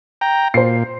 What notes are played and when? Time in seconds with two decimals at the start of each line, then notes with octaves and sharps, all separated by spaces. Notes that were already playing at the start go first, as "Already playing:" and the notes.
0.21 G5 A#5
0.54 A#2 C5 C7